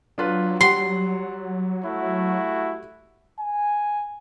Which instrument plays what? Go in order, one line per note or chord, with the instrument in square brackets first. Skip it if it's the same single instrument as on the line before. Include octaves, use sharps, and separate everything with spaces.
[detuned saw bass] F#3 [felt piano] D4 F4 B4
[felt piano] G3 F#5 [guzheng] C6
[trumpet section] A3 E4 F#4
[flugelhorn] G#5